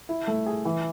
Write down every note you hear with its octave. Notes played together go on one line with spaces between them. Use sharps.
E4
A3
G#4
E3